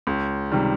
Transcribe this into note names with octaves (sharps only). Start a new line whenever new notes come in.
C#2
C3 D#3 G3